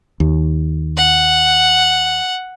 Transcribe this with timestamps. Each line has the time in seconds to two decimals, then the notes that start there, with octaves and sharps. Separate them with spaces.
0.20 D#2
0.97 F#5